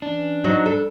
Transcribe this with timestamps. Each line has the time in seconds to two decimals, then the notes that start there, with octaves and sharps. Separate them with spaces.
0.02 E3 C#4 D4
0.44 F#3 D#4
0.66 G3 A4